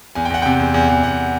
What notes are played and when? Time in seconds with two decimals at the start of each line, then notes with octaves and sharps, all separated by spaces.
0.15 E2 G#5
0.25 G5
0.30 E2 F#5
0.42 C3 G5
0.59 E2
0.74 E2
0.89 E2
1.03 E2 F#5